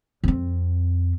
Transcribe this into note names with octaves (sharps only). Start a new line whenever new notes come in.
F2 C4